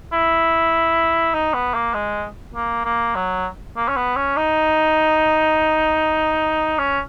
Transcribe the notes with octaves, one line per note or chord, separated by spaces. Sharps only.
E4
D#4
B3
A#3
G#3
A#3
A#3
F#3
A#3
C#4
B3
C#4
D#4
C#4